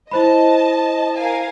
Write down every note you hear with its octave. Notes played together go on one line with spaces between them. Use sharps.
E4 C5 D#5 A5 B5
A#4 F5 G#5